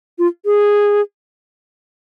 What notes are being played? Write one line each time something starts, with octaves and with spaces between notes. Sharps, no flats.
F4
G#4